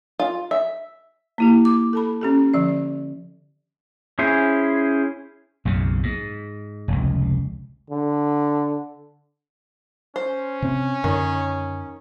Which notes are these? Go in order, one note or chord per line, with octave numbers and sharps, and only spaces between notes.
F4
E5
A#3 E4 G4
D6
A4 A5 B5
C#4 G4 A4
D3 F3 D5
C#4 E4 G#4 C5
B1 F#2 C#3
G#2
F1 C#2
D3
C#4 C5
C3 C4
F#2 D3 D#3 C#5